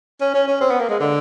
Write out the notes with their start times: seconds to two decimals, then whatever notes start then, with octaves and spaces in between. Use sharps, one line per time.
0.21 C#4
0.34 C#4
0.48 C#4
0.61 C4
0.70 B3
0.80 A#3
0.90 G#3
1.00 D3